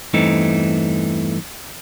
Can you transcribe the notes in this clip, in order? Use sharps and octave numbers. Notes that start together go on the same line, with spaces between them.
E2 G2 E3 A3 C4 D#4